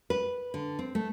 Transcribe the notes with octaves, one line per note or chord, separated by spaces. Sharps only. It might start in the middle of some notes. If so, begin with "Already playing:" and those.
B4
D3
C4
A3